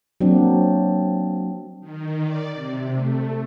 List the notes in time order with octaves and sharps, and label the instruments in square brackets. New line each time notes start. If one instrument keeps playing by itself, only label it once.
[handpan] F#3 A#3 C4 D4
[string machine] D#3
D5
C3
A3